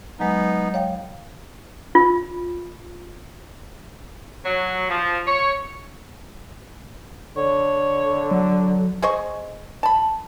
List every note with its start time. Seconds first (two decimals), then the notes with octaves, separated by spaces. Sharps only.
0.19 F#3 G#3 B3 D#4
0.74 C#5 F5 G5
1.95 F4
4.45 F#3
4.90 F3
5.27 C#5
7.37 D3 C#5
8.31 F#3
9.02 G#4 C5 D#5 C#6
9.83 A5 B5